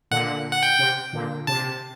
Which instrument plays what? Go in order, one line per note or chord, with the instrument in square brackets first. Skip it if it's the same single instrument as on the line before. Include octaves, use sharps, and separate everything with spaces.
[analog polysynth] A#2 D3 [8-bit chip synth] F#5
[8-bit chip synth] F#5
G5
[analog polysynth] C3
A#2 D3
[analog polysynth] C3 [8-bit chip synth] A5